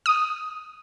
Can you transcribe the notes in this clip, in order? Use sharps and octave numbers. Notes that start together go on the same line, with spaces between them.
D#6